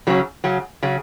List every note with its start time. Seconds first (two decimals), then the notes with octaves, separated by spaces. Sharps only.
0.07 C#3 F#3 C#4
0.44 C#3 F#3 C#4
0.83 C#3 F#3 C#4